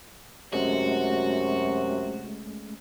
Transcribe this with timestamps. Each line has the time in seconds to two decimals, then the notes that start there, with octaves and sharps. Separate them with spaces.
0.53 F#2 C3 G#3 A3 C#4 F#4